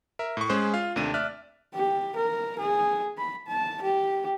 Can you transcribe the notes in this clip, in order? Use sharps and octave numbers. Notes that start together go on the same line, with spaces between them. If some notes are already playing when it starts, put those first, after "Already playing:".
A#4 E5
A2 C#6
G#3 C#4 G#4 C5 F#6
F4 F5
D#2 C3 A3 D4 D#7
D5 E5 F6 F#6
G4
A#4
G#4
B5
A5
G4